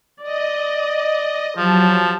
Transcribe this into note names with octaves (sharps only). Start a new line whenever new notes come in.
D5 D#5
F3 F#3 G4 A5